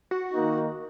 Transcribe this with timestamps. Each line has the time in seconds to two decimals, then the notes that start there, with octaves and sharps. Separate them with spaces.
0.11 F#4
0.33 D#3 A#3 D#4